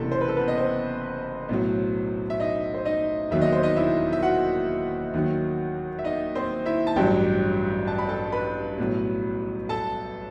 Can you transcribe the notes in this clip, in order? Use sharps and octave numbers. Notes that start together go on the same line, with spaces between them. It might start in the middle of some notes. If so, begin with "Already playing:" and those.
Already playing: F#1 E2 C3 E3 A4
C5
B4
A4
B3 B4
D#5
C4 C5
B1 A2 F#3
E5
D#4 D#5
C5
D#4 D#5
E1 D#2 D#3 F#3 E5
D#5
C5
D#4 D#5
E4 E5
E5
F#4 F#5
D#2 D#3 F#3
E5
D#4 D#5
C4 C5
E4 E5
A5
A1 G2 F#3 G4 G5
A5
B5
A4 A5
B4 B5
B1 A2 F#3
A4 A5